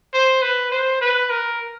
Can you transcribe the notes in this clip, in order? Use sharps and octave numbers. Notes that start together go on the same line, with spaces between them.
C5
B4
C5
B4
A#4